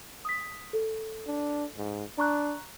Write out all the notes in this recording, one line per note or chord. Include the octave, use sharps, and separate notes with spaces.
D#6 B6
A4
D4
G#2
D4 A#5 C#6 F#6